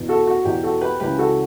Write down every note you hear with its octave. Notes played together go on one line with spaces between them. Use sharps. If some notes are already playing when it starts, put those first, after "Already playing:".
Already playing: E2 B2
F#4 A4
F#4
E2 B2 G4
F#4 A4
G4 B4
C#2 C#3 E3 G4 B4
F#4 A4